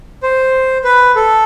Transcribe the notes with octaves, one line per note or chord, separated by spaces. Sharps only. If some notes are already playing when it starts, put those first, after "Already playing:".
C5
B4
A4